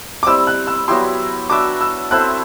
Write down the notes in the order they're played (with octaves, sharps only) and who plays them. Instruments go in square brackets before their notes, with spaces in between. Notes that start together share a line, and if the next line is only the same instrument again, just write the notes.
[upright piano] D6
[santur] G3 C4 E4 [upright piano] E6
[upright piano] F#6
E6
[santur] F#3 B3 E4 G4 [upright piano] C6
[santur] D4 F#4 B4 E5 [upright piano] D6
[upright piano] E6
[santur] C4 E4 A4 C5 [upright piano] F#6